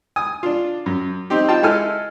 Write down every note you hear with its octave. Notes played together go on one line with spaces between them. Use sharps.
G#5 D#6
D4 F4
F#2
C4 D#4 G4
D#4 F4 G5 A5
G#3 E4 A4 G#5 F6